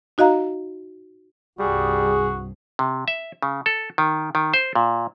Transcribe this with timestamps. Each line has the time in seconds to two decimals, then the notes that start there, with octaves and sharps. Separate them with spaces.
0.18 D#4 F#4 D#5 F5 A#5
1.59 C2 G2 G3 F#4 G#4
2.79 C3
3.08 E5
3.42 C#3
3.66 A4
3.98 D#3
4.35 D#3
4.54 C5
4.75 A#2